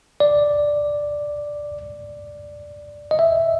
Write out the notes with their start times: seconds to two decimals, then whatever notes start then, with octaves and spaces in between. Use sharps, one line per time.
0.20 D5
3.11 D#5
3.19 E5